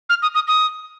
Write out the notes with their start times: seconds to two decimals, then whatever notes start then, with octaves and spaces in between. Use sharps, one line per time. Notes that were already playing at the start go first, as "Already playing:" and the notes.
0.09 F6
0.22 D#6
0.35 D#6
0.48 D#6